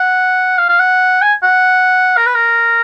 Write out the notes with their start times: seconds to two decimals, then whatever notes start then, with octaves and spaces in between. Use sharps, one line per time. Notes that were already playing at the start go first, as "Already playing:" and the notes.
Already playing: F#5
0.58 F5
0.69 F5
0.80 F#5
1.22 G#5
1.43 F#5
2.17 A#4
2.26 B4
2.35 A#4